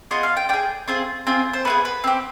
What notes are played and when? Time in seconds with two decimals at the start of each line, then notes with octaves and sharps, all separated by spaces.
0.11 B3 F4 G#4 D#5
0.23 F5
0.37 G5
0.49 D4 G#4 G5
0.88 C4 F4 G#4
1.27 C4 F4 G#4
1.53 C5
1.65 B3 F4 G#4 B4
1.85 B4
2.04 C4 G4